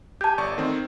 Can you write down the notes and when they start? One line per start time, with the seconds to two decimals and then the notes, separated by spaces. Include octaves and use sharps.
0.21 G4 A5 G6 G#6
0.38 G1 D5 C#6
0.58 D#3 A3 C4